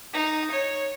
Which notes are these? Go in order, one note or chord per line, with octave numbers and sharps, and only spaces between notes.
D#4
C#5